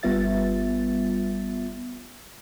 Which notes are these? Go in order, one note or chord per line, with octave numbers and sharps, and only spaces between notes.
G1 G3 B3 F4 E5 A6